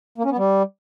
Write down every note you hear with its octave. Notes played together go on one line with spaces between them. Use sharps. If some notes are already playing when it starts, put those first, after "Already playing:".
A#3
C#4
B3
G3